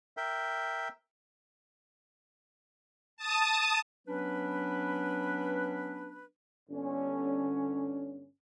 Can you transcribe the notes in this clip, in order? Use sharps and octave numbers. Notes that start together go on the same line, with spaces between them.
A#4 E5 G5
A5 D#6
F#3 B3 C#4 D4 B4
G1 D3 C#4